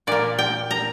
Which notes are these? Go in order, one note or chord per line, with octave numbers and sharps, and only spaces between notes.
A#2 A#3 D5
G5
A#5